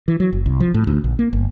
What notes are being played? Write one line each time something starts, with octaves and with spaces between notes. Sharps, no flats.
E3
F#3
F#1
C2
F3
A2
D2
A#1
A#3
G1